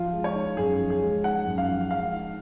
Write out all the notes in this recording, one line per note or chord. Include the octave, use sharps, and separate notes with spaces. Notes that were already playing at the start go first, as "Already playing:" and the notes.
Already playing: F3 F4
G#3
C#5
D#4
F#2 G#4
F3
G#4
G#3
D#4 F#5
F#2
F5
F3
G#3 F5
D#4